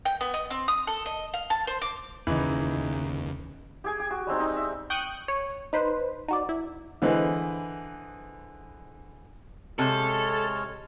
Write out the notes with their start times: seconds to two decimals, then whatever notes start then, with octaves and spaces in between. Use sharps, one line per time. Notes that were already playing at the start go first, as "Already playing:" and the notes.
0.05 G5
0.21 B3
0.34 D#5
0.51 C4
0.68 D#6
0.87 A4
1.06 D#5
1.34 F5
1.50 A5
1.67 C5
1.82 D6
2.27 D#2 C#3 E3 D#4 B4
3.84 G4 G#4 G#5
3.99 G4
4.11 F#4
4.27 G3 G#3 C4 D#4
4.39 C4 D#4
4.56 E5
4.90 G5 C#6 D#6 F#6 G6
5.28 C#5
5.73 D#4 B4 C5
6.28 D#4 F#4 D5
6.49 E4
7.02 D3 E3 G#4 B4 C5 D#5
9.79 C3 G#3 A4 C#5 F6